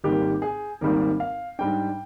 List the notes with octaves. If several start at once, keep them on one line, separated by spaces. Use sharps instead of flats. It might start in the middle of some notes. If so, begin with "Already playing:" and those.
G#1 G#2 D#3 G3 A#3 G4
G#4
G#1 G#2 D#3 G3 A#3 A#4
F5
G#2 G3 D4 G5